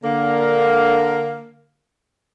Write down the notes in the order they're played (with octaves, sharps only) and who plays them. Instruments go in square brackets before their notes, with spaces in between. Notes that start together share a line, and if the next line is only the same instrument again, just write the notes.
[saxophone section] D3 A#3